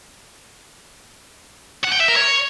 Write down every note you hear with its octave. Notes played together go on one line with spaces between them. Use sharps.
F#5
G5
E5
A#4
C#5